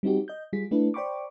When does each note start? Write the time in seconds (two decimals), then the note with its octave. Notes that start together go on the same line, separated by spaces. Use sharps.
0.03 G3 C4 D#4 F#4 G4
0.28 D#5 G6
0.53 G3 F4 G#4 B6
0.71 A3 D4 E4 A4 B4
0.94 C5 D5 G5 B5 C#6 D6